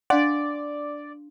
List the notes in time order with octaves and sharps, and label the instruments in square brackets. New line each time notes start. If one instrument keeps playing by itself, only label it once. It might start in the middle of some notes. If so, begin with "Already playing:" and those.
[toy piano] D4 F5 C6 [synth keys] D5 [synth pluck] F#5